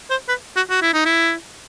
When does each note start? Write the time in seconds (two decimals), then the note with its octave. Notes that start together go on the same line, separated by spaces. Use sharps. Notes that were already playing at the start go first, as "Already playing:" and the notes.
0.10 C5
0.28 B4
0.56 F#4
0.70 F#4
0.82 E4
0.94 D#4
1.05 E4